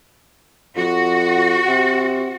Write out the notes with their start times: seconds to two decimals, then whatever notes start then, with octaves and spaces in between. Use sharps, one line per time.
0.76 F2 F#4
1.68 C3